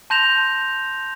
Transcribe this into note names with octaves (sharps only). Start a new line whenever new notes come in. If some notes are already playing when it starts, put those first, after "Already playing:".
A5 C6 G6 A#6 E7 F7